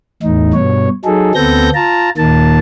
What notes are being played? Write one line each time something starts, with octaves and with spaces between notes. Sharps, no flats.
E2 A2 D#4
G2 B2 C#5
F#3 D#4 G#4 A4
D2 B3 C4 A4 G6 A#6
F4 A5 A#5
D#2 A#2 D#3 A#3 A5